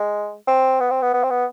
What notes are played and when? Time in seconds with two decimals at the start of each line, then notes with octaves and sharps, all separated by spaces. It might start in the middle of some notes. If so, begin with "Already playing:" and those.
Already playing: G#3
0.47 C4
0.80 B3
0.91 C4
1.02 B3
1.14 B3
1.23 C4
1.30 B3